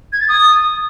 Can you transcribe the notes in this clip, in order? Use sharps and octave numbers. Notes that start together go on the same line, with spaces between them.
G#6
A6
D#6